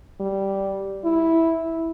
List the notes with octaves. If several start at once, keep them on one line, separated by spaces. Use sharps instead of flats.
G3
E4